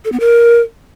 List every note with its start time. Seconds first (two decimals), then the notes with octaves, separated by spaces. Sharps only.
0.05 A4
0.12 B3
0.20 A#4